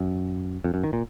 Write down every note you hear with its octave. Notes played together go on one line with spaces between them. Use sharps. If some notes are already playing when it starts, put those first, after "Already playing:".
Already playing: F#2
F2
F#2
D#3
A#2